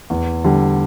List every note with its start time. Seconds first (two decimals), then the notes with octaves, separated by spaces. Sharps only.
0.10 E2
0.44 D3 G3